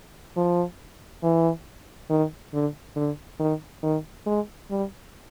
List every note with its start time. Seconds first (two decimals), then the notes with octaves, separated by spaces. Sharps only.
0.37 F3
1.23 E3
2.10 D#3
2.53 D3
2.96 D3
3.40 D#3
3.83 D#3
4.27 G#3
4.71 G3